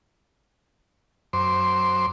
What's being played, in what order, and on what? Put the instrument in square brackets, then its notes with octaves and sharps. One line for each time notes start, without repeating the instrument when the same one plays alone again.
[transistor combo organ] F#2 C5 C6 D6